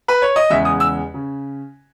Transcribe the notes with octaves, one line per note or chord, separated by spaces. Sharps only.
B4
C#5
D#5
E2 C#3 G#3 E5
D#6
E6
C#3